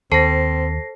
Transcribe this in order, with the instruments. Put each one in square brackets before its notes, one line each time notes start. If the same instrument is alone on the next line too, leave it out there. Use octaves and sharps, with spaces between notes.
[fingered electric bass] D#2 [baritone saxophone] C4 [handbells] A4 C5 A5 [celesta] A#6 C7